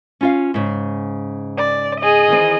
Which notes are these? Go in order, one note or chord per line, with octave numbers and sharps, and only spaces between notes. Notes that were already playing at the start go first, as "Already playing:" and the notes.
C#4 F4 F5
G#2 C#3
D5
G#4 D#5
D#3 E3 C4